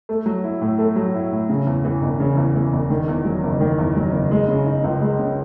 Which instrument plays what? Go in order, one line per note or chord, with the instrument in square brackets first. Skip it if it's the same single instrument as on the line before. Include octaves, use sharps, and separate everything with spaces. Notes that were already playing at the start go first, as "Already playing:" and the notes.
[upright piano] A3
F#3
E4
A2
A3
F#3
E4
A2
C#3
E2
E3
E1
C#3
E2
E3
E1
D#3
E2
F#3
F#1
D#3
E2
F#3
F#1
G#3
C#3
D#4
C#2
G#3
C#3